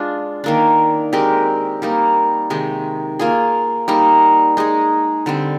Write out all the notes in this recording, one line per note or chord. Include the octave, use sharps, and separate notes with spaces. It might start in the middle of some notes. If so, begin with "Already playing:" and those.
Already playing: G#3 D4 F4
D#3 A#3 D4
G#3 C4 G4 A#4
G3 A#3 D#4
C3 D#3 G#3
A#3 F4 G#4
G3 A#3 D#4
G#3 D#4 G#4
D3 G3 C4